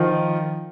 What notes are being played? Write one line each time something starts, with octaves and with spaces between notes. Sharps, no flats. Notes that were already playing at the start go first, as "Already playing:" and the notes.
Already playing: D#3 F3